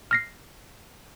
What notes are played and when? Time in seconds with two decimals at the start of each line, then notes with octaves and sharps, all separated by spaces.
0.11 F6 A#6 C7